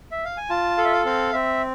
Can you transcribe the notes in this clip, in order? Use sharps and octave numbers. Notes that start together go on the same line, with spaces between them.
E5
F5
G#5
F4 A5
A4 F5
E5
F5
C4 F5
C4 E5